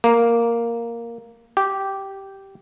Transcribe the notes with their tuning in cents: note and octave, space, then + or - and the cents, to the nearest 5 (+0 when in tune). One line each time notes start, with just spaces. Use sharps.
A#3 +0
G4 -10